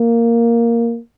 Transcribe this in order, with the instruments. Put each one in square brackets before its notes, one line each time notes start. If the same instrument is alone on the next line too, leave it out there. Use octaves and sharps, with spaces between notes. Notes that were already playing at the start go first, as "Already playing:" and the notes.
Already playing: [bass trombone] A#3